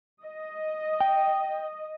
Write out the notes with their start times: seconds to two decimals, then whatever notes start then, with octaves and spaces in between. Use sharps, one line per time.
0.24 D#5
1.00 G5